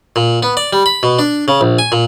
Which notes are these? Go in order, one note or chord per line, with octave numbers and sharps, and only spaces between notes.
A#2
B3
D5
G3
B5
B2
D4
C#3
A#1
G#5
A#2